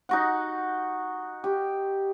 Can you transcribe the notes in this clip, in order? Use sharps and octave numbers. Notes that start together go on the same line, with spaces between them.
D#4 F#4 F#5
G4